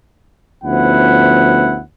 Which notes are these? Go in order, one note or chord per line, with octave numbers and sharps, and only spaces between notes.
D2 F3 B3 C#4 E4 F#5